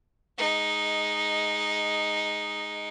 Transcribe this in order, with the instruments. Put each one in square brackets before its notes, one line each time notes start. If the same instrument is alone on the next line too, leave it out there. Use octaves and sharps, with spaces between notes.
[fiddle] G#3 D#4